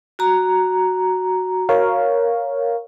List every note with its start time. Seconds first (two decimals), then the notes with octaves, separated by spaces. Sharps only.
0.19 F#4 A#5
1.69 A#4 C#5 F5